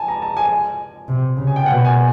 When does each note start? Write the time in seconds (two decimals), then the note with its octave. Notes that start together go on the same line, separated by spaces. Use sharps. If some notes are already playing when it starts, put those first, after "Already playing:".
Already playing: G#5 A5
0.08 A#5
0.22 A5
0.37 G#5
1.08 C3
1.37 C#3
1.47 G#5
1.56 G5
1.66 B2 F#5
1.85 G#5